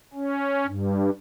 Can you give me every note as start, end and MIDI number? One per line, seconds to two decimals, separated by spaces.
0.13 0.66 61
0.66 1.10 43